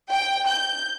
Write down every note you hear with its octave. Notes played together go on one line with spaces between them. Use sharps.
G5
G6